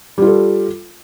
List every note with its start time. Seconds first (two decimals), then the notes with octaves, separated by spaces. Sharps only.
0.18 G3
0.22 F4
0.26 A4